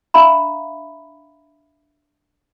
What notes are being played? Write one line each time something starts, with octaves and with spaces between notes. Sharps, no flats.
D4 E5 F5 A#5 B5